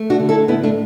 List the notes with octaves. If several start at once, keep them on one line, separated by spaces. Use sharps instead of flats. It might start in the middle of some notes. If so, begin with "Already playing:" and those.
Already playing: A3
D4 F#4
D3
E4 A4
A2 B3 E4
A3 D4